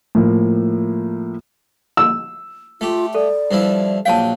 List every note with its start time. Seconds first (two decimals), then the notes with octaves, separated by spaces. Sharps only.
0.15 A2 F3 A#3
1.97 E6
2.81 A3 F4 G4
3.15 A4 D5
3.51 G2 F3 E4
4.05 A#1 F#3 F5 G5 A5